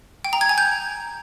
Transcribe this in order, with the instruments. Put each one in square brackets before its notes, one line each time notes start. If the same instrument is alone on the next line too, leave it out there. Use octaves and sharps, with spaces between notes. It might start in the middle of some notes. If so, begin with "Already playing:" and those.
[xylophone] G5
A#5
G#6
G#5
G6